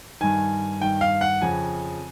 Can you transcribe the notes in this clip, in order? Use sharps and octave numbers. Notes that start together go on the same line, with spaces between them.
G2 D#3 G#5
G2 D#3 G5
F5
F#5
F2 C#3 F3 G#5